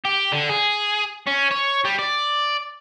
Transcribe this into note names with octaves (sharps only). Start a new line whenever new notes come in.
G4
D3
G#4
C#4
C#5
G3
D5